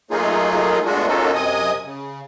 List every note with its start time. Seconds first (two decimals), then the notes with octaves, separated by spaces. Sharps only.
0.11 F#3 A3 A#3 D#4 F4 G#4
0.85 G#3 A3 B3 D4 F4 F#4
1.07 A#3 C#4 D#4 F4 F#4 A4
1.34 F#2 C3 D#5 G#5 D#6
1.85 C#3